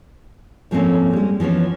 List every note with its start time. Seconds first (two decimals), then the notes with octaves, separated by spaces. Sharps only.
0.71 G#2 F3 A3 A#3 C4 C#4
1.13 G3 G#3
1.40 E3 F3 B3 C#4